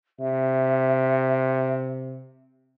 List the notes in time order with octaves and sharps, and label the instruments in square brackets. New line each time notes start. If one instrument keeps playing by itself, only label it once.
[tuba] C3 [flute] E5